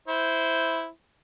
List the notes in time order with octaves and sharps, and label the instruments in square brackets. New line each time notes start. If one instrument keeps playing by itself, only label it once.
[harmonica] E4 C5